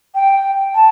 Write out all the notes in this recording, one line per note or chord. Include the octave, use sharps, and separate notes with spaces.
G5
A5